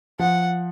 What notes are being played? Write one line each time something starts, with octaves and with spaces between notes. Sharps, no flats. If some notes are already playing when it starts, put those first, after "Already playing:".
F3 F#5